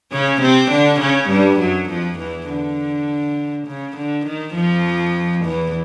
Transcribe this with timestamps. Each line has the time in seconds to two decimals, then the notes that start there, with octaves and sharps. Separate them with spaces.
0.12 C#3 C#4
0.41 C3 C4
0.70 D3 D4
1.00 C#3 C#4
1.30 G2 G3
1.60 F#2 F#3
1.89 F2 F3
2.19 E2 E3
2.49 D3
3.67 C#3
3.97 D3
4.26 D#3
4.56 F2 F3
5.45 E2 E3